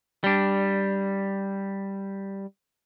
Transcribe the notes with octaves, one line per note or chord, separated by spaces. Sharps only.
G3 D4